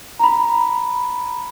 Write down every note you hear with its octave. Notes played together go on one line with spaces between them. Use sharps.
A#5 B5